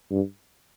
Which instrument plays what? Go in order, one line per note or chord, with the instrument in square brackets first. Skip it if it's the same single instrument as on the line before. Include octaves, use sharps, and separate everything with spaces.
[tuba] G2